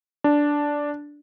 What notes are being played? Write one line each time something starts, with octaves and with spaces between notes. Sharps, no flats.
D4